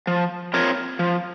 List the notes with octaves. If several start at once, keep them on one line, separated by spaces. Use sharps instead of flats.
F3
C4 F4 A#4 C#5
F3